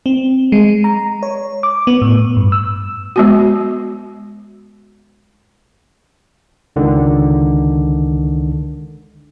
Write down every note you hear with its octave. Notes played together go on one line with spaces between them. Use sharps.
C4
G#3
A#5
C#5
D6
B3
A2
G2
E6
G#3 B3 F#4
C#2 D3 D#3